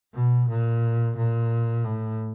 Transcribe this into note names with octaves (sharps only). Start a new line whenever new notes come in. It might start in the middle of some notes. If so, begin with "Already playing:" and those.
B2
A#2
A#2
A2